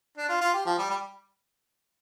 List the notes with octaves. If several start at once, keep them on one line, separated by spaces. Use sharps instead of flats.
D4
F4
F4
G4
F3
G3
G3